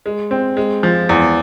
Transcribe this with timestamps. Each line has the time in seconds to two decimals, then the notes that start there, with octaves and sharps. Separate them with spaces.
0.06 G#3
0.31 C4
0.57 G#3
0.83 F3
1.09 E2